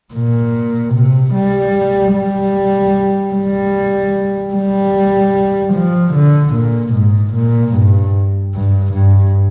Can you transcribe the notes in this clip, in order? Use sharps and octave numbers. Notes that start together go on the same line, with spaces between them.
A#2
C3
G3
G3
G3
G3
F3
D3
A#2
G#2
A#2
G2
G2
G2